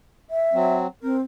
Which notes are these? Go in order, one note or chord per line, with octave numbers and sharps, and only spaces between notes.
E5
F#3 C4
C4 A#4